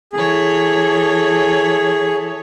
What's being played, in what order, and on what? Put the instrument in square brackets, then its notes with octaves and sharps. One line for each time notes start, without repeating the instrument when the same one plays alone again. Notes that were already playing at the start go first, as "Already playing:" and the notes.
[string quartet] E3 A4 C#5 [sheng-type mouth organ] G#4